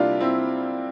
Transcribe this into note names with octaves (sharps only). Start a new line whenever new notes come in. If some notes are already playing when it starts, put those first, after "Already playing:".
Already playing: C3 G3 A#3 D4 E4 F4 G4
C4 E4